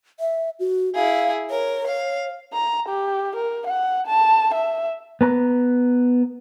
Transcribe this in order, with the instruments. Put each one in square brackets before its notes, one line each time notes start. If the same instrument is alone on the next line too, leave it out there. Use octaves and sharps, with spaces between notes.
[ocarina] E5
F#4
[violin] E4 G#4 [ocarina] F5
[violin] A#4 [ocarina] C#5
[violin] F5
[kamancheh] A#5
G4
A#4
F#5
A5
E5
[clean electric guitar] B3 B4 A#5